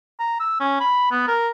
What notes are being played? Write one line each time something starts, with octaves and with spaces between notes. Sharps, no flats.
A#5
E6
C#4
B5
B3
A#4